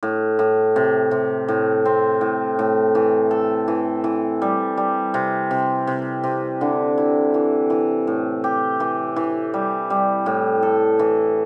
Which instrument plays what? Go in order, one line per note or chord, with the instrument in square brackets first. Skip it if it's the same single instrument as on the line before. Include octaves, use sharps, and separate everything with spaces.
[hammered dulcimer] A2
A2
C3
C3
A2
C4
A2
A2
E3
A4
E3
E3
G3
G3
C3
C3
C3
C3
D3
E4
E3
E3
A2
G4
E3
E3
G3
G3
A2
A4
E3